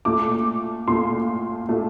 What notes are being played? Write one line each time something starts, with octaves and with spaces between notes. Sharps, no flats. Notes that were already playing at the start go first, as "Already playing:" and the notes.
A#2 A3 D6
A#2 A3 C6
A#2 A3